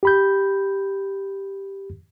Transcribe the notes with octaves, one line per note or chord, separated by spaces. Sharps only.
G4 B5 G6